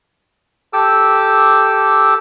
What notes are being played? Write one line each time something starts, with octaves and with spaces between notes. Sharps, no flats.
G4 A4 D6 E6